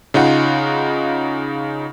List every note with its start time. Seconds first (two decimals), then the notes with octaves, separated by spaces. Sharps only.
0.14 C#3 D#4 F4 F#5